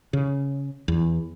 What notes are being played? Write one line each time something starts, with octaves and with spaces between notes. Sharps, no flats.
C#3
E2